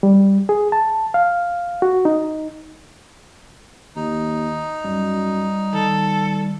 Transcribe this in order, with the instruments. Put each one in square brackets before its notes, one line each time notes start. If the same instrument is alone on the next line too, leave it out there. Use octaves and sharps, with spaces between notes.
[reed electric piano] G3
G#4
A5
F5
F#4
D#4
[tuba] D#2 [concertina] D#4
[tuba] F#2 [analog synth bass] G3
[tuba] D#3 [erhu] A4